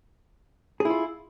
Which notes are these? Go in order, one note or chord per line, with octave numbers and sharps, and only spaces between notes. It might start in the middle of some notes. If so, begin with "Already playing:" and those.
E4 F4 G#4